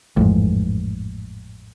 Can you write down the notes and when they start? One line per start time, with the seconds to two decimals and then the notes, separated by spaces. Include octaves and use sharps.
0.17 A1 F2 G#2